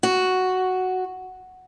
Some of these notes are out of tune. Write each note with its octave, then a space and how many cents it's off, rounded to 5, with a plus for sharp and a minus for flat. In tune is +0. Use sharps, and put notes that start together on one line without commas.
F#4 +0